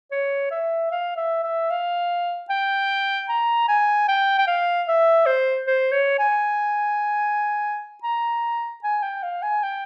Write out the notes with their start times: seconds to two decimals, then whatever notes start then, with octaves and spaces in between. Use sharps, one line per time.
0.11 C#5
0.51 E5
0.91 F5
1.17 E5
1.43 E5
1.70 F5
2.50 G5
3.29 A#5
3.68 G#5
4.08 G5
4.39 G5
4.47 F5
4.88 E5
5.26 C5
5.67 C5
5.92 C#5
6.19 G#5
8.03 A#5
8.84 G#5
9.02 G5
9.23 F5
9.42 G#5
9.63 G5